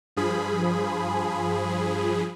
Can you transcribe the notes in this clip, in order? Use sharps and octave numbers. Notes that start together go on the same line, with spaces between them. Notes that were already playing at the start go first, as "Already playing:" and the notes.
G2 F3 G#4 B5